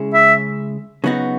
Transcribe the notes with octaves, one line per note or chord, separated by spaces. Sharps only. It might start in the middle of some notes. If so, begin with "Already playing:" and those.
Already playing: C#3 G#3 C#4 E4 G#4
E5
C#3 F#3 B3 D#4 F#4